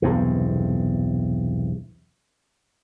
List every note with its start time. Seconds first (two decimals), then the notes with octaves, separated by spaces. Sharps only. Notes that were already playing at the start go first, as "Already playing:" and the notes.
0.02 B1 E2 G2 C3